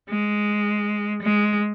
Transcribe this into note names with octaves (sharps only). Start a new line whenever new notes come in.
G#3
G#3